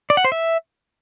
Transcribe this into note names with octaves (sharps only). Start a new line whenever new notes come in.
D5
F#5
C5
E5